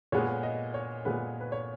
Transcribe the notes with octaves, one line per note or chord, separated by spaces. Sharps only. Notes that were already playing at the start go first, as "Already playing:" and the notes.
A#2 G#3 B3 C#5
D#5
C#5
A#2 G#3 B3 B4
B4
C#5